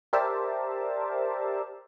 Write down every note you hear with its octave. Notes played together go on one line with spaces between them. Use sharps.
G4 A#4 C5 D5 E5 A5